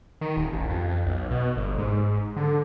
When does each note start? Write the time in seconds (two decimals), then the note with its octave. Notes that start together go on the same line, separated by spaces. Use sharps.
0.21 D#3
0.37 D#1
0.53 A1
0.69 F2
1.05 B1
1.31 B2
1.57 G1
1.78 G#2
2.36 D3